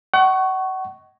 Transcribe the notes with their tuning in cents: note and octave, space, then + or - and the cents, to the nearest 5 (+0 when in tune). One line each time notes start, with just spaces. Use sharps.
D#5 +0 F#5 +35 C#6 +0